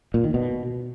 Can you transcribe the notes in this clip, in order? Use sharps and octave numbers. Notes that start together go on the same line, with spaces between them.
A#2
D#3
B2